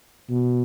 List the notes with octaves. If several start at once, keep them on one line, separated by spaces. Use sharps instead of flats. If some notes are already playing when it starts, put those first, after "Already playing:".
B2